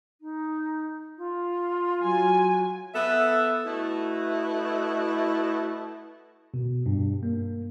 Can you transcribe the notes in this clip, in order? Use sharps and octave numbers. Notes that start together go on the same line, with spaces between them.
D#4
F4
F#3 G#5
B3 A4 E5
A3 E4 F#4 B4 D#5 E5
B2
G2
A#3